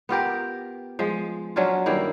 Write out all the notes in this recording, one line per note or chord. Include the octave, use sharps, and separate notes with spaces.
B3 F4 G4 A#4
F3 G#3
F#3 C#4 D4 F4
G2 D#3 A#3 E4